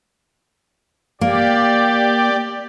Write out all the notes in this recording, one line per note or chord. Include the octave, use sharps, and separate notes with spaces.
A#3 G4 D5